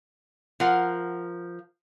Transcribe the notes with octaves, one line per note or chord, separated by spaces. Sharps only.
F3 A#4 F#5